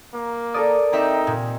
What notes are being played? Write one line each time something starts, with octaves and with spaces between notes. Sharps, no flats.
A#3
A4 A#4 D5 D#6
C4 D#4 G4 E5
A#2